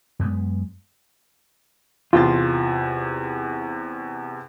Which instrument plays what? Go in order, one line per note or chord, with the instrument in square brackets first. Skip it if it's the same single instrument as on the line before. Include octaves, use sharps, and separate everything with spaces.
[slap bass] F#2 G#3 B3
[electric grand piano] E2 C3 A6 [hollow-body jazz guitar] F4